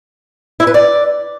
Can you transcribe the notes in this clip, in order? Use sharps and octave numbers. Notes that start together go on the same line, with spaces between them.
E4
B4
D5